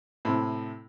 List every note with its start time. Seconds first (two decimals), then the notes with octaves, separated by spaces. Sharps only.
0.25 A2 C3